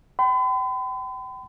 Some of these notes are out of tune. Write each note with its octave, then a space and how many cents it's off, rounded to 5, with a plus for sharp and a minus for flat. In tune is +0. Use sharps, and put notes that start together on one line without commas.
G5 -35 B5 +45